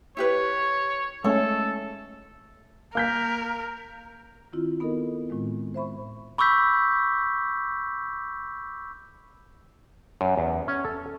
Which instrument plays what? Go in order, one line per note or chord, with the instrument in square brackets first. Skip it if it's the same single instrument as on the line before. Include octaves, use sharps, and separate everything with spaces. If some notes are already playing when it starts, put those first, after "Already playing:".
[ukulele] E4 G4 B4 [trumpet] C#5
[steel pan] G#3 A3 C#4 [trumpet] A4 [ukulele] C#5
[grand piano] A#3 G6 B6 [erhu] A#4
[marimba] D#3 C4 E4 F4
B3 D#4 A4 A#4 D#5
A2 D#3 G#3 C4 F4
C5 E5 B5 C#6
[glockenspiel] B5 C#6 D6 E6 G6 B6
[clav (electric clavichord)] F#2
E2
C#4
A4